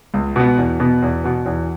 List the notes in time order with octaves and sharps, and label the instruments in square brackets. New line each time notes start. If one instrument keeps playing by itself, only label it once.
[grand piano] C#2
B2 B3
E2
B2 B3
E2
B2 B3
E2